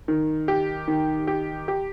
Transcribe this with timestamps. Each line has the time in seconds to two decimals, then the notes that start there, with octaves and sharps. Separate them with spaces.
0.08 D#3
0.48 G4
0.88 D#3
1.27 G4
1.68 G4